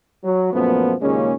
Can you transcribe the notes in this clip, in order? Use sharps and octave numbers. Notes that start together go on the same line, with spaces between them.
F#3
F#2 A#2 F3 A3 B3
D#2 A#2 C#3 G#3 A#3 C#4